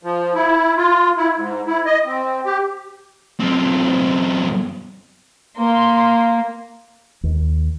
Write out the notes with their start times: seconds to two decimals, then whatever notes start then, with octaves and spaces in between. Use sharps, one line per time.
0.03 F3
0.35 E4
0.77 F4
1.17 E4
1.35 G#2
1.67 E4
1.86 D#5
2.06 C4
2.45 G4
3.40 F#2 C4
5.58 A#3 C6
7.23 D#2